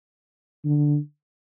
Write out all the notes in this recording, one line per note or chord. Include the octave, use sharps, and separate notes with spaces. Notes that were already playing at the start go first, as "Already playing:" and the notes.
D3